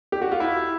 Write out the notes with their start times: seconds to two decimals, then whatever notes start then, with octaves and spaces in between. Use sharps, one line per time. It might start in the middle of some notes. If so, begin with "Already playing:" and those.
0.12 G4
0.22 F#4
0.32 F4
0.40 E4